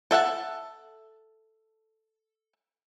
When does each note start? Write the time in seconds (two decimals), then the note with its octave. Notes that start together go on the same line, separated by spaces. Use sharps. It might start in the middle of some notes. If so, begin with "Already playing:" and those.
0.11 A4 E5 F#5 A5